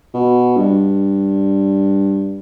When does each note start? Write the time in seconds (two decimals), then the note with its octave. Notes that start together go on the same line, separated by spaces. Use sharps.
0.14 B2
0.57 G2